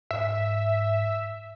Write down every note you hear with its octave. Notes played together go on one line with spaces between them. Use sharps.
G#2 E5